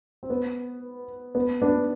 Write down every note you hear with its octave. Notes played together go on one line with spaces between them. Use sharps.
C4
B3
B3
B3 D4